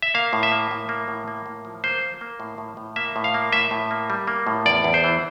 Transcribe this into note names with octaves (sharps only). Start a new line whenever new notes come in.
E5
A#3 F5
A2
E5
A#3
A2
A#3
A2
A#3
A2
F3
A#3 C5
A#3
A#3
A2
A2
A2
A#3 E5
A2
F5
A#3
A2 E5
A2
A#3
G3
A#3
A2
E2 D5
E2
C5
E3